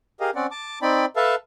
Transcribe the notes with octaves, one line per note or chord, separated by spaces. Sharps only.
G4 G#4 A#4 D#5 F5
C4 C#4 D5 F#5
A5 D6
C4 D#4 D5 G5 B5
A4 B4 E5 F5 A5